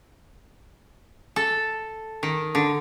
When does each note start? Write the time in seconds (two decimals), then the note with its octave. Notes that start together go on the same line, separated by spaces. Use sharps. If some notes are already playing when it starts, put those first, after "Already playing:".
1.36 A4
2.23 D#3
2.55 D3